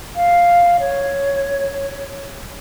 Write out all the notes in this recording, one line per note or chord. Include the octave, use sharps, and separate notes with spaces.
F5
C#5